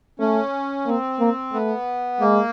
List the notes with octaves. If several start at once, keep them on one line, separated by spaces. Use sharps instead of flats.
A3 C#4
A#3 C4
A#3
A3 B3
G#3 A#3